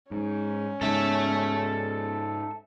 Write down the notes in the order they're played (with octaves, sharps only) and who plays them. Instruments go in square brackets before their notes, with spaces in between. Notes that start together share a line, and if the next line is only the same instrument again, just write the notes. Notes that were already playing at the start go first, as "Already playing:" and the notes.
[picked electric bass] G#2 [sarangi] C#4
[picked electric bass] G#2 C#3 [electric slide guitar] A4 E5